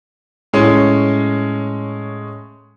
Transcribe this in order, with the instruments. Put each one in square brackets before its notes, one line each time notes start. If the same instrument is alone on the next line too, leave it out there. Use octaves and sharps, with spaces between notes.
[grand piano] A2 G#3 C#4